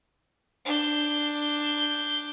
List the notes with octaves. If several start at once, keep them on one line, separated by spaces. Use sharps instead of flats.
D4 G6